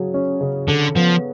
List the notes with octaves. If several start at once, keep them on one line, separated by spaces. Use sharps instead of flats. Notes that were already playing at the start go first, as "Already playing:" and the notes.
Already playing: C#3 F#3 G#4
C#4
C#3
D3 A4
F3 B3